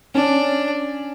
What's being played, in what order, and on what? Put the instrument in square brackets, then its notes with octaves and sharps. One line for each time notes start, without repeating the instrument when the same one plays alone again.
[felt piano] C#4 [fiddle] D4